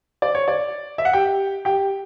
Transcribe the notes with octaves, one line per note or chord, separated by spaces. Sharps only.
D5
C#5
D5
E5
F#5
G4 G5
G4 G5